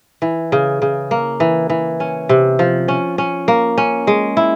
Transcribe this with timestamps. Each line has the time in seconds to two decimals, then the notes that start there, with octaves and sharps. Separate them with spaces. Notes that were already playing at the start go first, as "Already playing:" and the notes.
0.22 E3
0.52 C#3
0.82 C#3
1.11 A#3
1.40 E3
1.70 E3
2.00 C#4
2.29 C3
2.59 F3
2.88 C#4
3.18 C#4
3.48 A#3
3.78 C#4
4.07 G#3
4.37 E4